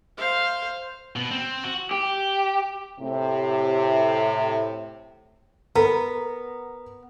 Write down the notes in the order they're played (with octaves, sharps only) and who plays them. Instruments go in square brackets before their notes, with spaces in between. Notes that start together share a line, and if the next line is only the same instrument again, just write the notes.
[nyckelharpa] C5 F5
[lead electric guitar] B2
C4
F#4
[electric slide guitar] G4
[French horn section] A2 C3
[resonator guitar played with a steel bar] B3 [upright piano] A#4 A#5